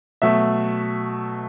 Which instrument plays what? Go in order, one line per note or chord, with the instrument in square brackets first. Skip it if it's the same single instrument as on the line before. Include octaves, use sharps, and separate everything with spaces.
[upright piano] B2 F#3 A3 E5